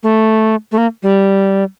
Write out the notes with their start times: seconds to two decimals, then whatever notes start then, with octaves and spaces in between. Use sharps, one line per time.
0.03 A3
0.72 A3
0.78 A#3
1.03 G3